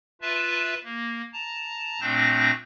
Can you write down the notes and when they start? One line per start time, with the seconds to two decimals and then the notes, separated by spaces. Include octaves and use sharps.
0.22 F4 B4 E5 A5
0.84 A#3
1.33 A5 A#5
2.01 A#2 A3 C4 D4 G6 A#6